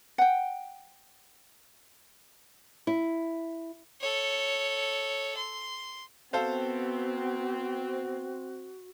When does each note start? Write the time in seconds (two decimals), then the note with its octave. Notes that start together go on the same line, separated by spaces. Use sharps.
0.18 F#5 G5
2.87 E4
4.01 A4 C#5
5.37 C6
6.33 B3 C4 F#4 A4 C5 F5